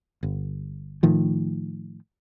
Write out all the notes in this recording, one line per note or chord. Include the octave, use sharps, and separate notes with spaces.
G1
A2 D#3 F3